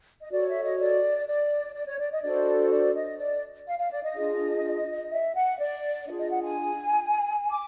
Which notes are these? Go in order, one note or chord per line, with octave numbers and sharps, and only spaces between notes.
D#5
F#4 A4 C#5 D5
E5
D#5
D5
D5
D5
C#5
D5
D#5
D4 F#4 A4 C5 D5
D5
D#5
D5
F5
F5
D5
D#5
D4 F4 G#4
E5
F#5
D5
D4 F4 G#4 D#5
D#5
F#5
G#5
D6